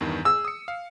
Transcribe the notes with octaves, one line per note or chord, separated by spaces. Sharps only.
E2 G2 D#3
G#4 E6
D#6 C#7
F5